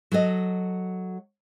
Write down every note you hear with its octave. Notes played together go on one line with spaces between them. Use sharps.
F#3 F#4 A4 D#5